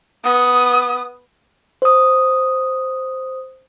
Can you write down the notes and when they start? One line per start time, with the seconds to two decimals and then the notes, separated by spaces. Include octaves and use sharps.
0.24 B3 D#6
1.82 C5 D#6